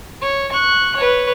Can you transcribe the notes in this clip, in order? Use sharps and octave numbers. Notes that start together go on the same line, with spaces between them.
C#5
C#6 F#6
B4 C#5